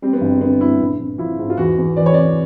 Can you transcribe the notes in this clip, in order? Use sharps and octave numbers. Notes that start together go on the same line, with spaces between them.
G3 C4
B3
G1 C4
D3 B3
G2 E4
A#1
A#1
F3 E4
G#2
F4
E2 F#4
E2
E3 D5
C#5
C3 D5